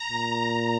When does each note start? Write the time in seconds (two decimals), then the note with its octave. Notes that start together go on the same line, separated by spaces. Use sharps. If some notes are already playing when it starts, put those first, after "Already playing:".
Already playing: A#5
0.09 A#2